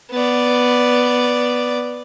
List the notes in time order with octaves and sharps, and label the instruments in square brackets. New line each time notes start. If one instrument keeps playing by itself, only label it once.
[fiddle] B3 D5